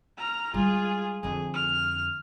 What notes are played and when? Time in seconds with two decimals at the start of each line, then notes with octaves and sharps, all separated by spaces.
0.17 A#5 F6
0.54 G3 G#3 F4 G#4
1.23 F2 D3 G#4
1.54 F6